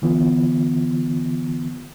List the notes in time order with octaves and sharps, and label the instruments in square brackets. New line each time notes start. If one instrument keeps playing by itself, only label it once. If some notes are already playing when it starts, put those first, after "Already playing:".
[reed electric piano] D3 E3 B3 F4